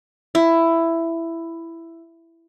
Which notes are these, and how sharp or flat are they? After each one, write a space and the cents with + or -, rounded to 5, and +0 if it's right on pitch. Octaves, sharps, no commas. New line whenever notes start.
E4 +10